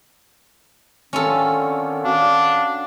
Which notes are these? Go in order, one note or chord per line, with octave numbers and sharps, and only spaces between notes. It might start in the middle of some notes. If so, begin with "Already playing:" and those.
D3 D#3 C4 C#4 F4 A4
D4 F#4 F5